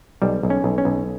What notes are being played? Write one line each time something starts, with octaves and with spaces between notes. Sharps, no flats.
B1 G3
B1
C#4
B1
C#4
B1